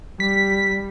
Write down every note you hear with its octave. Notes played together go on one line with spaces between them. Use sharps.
G3 B6